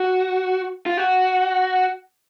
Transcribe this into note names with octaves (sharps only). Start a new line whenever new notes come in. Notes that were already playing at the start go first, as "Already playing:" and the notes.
Already playing: F#4
F4
F#4